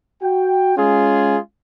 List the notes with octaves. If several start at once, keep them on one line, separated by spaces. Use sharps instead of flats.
F#4 G5
G#3 C#4 F4 G#4